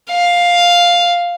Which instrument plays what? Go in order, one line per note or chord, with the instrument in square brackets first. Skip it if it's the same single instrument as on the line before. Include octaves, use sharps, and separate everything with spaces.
[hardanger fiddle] F5